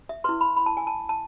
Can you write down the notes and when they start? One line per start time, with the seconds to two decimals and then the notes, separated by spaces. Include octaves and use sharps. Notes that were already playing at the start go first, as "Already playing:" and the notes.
0.09 E5
0.24 E4 B4 C6
0.41 B5
0.56 B5
0.66 A5
0.77 G#5
0.87 A5
1.09 A5